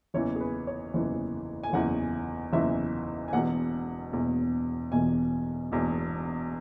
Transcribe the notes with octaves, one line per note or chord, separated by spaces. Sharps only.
F#1 E2 E3 C#5
G#4
B4
C#5
F#1 E2 E3
G#5
F#1 E2 E3 F#5
F#1 E2 E3 E5
G#5
E1 E2 B2 F#5
E1 E2 B2
E1 E2 B2 G#5
E1 E2 B2